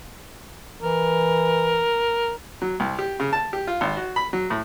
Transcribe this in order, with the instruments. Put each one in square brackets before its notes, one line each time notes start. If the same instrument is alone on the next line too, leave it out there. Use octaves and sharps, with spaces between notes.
[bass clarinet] E3 [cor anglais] A#4
[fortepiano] F#3
C2
G4
C#3
A5
G4
F4
G#1
F#4
B5
F#3
A2